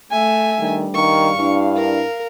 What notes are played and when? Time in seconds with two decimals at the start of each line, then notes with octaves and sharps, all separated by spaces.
0.11 A3 E5 G#5
0.59 G2 D#3 G3 D4
0.95 D#3 F5 C#6
1.37 G2 D4 E4
1.77 A#4